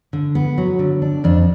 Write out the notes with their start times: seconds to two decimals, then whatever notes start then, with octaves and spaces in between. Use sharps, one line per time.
0.13 D3
0.35 B3
0.58 F#3
0.79 D3
1.02 D4
1.24 F2 D4